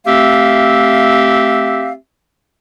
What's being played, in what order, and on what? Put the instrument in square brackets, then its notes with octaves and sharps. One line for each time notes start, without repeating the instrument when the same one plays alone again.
[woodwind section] A3 C4 G4 E5 F5